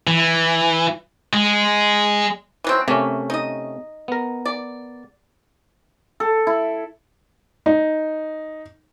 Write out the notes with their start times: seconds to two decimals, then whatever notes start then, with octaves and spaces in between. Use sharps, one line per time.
0.07 E3
1.33 G#3
2.64 E3 F#3 C4
2.88 C3 A3 A#3 C#4
3.30 D#4 D#5
4.08 B3 A#4
4.45 D5
6.20 A4
6.47 E4
7.66 D#4